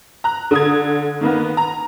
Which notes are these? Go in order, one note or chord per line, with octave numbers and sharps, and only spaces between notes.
A#5 F#6
D3 D#6 G#6
D#3 A#3 B3
A#5